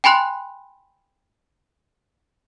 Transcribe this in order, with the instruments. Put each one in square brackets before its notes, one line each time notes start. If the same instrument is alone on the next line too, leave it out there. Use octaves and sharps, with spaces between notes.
[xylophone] G5 G#5 B5 C6 F#6